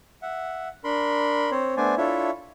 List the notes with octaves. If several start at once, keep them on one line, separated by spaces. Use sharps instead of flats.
E5 F#5
D4 A#4 B5 C6
C4 C5 C#5
A3 B3 D4 C5 D5 G#5
D4 E4 F4 A4 C#5 E5